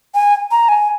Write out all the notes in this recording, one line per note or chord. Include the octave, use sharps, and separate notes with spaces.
G#5
A#5
G#5